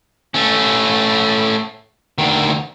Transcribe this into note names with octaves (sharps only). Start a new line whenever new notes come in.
A3 C#4
D2 D#3